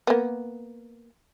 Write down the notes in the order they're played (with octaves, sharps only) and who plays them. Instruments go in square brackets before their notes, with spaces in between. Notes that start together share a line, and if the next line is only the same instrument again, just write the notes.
[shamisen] A#3 B3